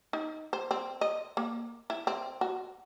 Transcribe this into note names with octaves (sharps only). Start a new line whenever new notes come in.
D#4
C5
C4
D#5
A#3
E4
C4
F#4